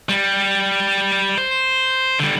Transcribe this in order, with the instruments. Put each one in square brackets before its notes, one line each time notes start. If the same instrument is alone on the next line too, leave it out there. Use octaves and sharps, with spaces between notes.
[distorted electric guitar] G3
C5
D3 G3